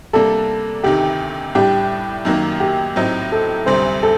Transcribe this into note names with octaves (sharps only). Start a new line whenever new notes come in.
C3 G3 A#3 D4 A4
D2 C3 D#3 G4
A2 G3 D4 G4
F#2 D#3 F#3 A#3
G4
A2 F#3 C4 D#4
A4
D2 C3 G3 C5
A4